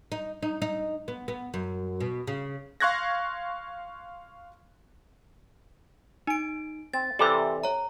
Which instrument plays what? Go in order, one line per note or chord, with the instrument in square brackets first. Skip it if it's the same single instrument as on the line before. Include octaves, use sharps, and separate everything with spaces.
[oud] D#4
D#4
D#4
B3
B3
F#2
B2
C#3
[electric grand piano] F5 C6 C#6 F#6 G#6 A#6
[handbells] D#4 D7 [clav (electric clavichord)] G#5
[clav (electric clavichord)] C4 [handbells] A6
[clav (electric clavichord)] C3 E3 D5 [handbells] G4 A4 E5
[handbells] C#5 A#5